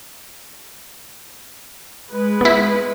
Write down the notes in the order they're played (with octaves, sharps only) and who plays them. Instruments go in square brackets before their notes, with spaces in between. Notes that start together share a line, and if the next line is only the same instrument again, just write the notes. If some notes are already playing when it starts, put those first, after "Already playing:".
[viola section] G#3 B4
[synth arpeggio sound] B3 E4